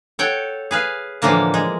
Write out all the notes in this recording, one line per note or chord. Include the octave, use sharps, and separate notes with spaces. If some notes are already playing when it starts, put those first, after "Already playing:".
A4 C#5 F#5 G5
G#4 B4 F5
A2 D3 E3 F3 A#3 A5
G#3